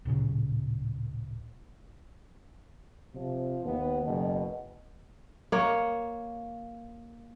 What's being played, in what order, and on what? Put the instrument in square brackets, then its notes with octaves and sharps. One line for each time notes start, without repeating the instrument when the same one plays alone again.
[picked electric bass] D1 A#2 C#3
[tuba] C3 [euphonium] F3
[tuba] D#2 [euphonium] B3
[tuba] F#1 [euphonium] B2
[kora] A#3 C#5